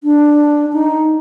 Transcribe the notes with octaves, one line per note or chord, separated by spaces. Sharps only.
D4
D#4